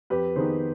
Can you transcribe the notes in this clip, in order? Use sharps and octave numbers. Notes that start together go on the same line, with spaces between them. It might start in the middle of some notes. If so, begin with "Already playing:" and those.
F2 G4 B4
D#3 B3 D#4 G#4 C5